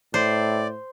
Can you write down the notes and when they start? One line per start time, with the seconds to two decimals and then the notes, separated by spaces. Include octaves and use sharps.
0.14 A2 C5 D5